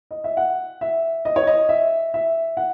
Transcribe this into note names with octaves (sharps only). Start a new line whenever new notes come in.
D#5
E5
F#5
E5
D#5
C#5
D#5
E5
E5
F#5